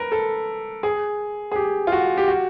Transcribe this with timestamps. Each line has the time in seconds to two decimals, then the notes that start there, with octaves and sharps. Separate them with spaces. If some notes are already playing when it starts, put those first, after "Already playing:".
Already playing: A#4 B4
0.12 A4
0.83 G#4
1.52 G#4
1.56 G4
1.87 F4
1.92 F#4
2.18 G4
2.28 F#4